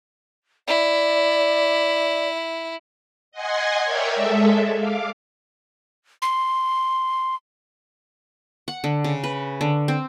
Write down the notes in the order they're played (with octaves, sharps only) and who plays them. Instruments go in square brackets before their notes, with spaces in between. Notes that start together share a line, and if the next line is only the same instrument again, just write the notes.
[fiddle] E4 [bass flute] D5
[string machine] D#5 F#5 G#5 C6 G#6
A#4 C#5 D5 E5 G5
G#3 A4 E5
F5 D6
[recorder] C6
[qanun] F#5
D3
C#3
B4
D3
C4